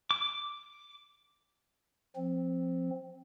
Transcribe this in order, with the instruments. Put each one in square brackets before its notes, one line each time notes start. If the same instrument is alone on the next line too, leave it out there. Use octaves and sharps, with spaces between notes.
[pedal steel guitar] D6
[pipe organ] F3 C4